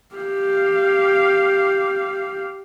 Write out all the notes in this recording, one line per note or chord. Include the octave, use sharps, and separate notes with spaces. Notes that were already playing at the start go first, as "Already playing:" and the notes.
G4 F5